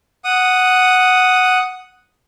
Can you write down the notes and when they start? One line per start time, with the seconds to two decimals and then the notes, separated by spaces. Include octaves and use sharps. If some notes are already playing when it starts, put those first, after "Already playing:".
0.24 F#5 D#6